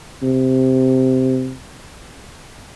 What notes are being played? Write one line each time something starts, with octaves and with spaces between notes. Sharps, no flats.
C3